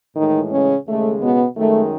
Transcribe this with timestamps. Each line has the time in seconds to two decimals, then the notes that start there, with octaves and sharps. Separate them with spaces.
0.16 A2 D#3 E3 G#3 D#4
0.52 C#3 C#4
0.86 D#2 C#3 G#3 A3
1.21 B2 B3
1.56 F#2 D#3 G#3 A3